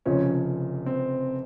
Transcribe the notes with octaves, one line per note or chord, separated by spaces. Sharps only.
F1 F2 C#3 F3 C#4
C4